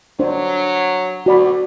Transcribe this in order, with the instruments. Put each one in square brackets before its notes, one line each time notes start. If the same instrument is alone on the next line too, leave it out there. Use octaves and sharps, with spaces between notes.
[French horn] F#3 [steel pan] D4 C5
[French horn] D2 [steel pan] F#4 D5 B5